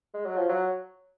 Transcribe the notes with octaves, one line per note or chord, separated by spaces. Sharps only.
G#3
F#3
F3
F#3